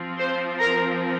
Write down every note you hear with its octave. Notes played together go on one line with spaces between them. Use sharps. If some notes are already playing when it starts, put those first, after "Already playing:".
Already playing: F3 C4 F4
C5 C6
A#4 A#5